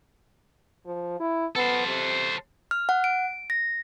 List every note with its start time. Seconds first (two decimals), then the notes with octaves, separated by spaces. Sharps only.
0.86 F3
1.20 E4
1.55 B3 A4 C5
1.87 C3
2.71 F6
2.89 F#5
3.04 D7
3.50 A#6